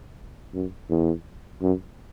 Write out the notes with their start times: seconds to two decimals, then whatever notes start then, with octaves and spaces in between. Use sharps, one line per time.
0.54 F#2
0.90 E2
1.62 F#2